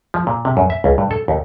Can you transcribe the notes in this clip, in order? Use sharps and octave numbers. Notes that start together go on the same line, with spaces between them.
F3
A#2
C3
F#2
E5
C#2
G2
A4
D#2